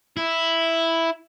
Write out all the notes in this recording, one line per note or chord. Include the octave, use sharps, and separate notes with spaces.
E4